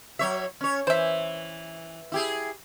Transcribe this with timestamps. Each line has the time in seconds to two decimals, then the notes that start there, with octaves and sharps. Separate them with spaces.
0.19 F#3 C#5 E5
0.61 C#4 C#5
0.87 E3 C5 E5
2.12 E4 G4 G#4